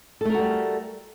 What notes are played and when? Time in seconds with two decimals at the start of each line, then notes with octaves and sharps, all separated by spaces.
0.21 A4
0.25 A3
0.30 A#4
0.34 F#4
0.39 G3